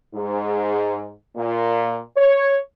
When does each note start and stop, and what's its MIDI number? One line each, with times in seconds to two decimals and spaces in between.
0.14 1.09 44
1.35 1.98 46
2.17 2.55 73